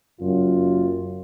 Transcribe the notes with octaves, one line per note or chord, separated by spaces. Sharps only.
F#1 F#2 F4